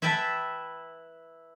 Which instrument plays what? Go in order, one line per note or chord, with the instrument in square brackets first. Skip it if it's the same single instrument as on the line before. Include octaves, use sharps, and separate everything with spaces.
[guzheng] E4 B4 E5 G5 A5